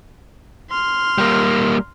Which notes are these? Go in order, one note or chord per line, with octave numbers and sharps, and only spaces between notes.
C6 F6
G3 A#3